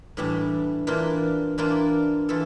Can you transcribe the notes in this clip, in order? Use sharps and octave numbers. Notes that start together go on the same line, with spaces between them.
A2 E3 G3 D4
E3 A#3 D4 F4
E3 A#3 D4 F4
E3 F4 A4